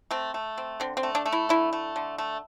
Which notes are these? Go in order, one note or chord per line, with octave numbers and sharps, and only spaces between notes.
A3 C4
A3
C4
D3 C4
C4
A3
D4
A3
E4
D3 E4
A3
D3
A3